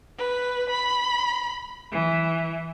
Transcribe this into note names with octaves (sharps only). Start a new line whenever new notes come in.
B4
B5
E3